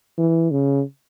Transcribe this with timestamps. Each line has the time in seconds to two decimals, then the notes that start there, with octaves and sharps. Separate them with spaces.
0.18 E3
0.51 C#3